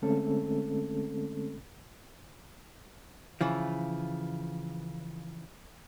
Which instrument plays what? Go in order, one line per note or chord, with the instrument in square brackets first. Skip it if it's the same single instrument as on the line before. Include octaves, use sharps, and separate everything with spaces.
[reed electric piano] D3 G#3 A3 C4 C#4 A4
[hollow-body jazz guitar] C#3 E3 F3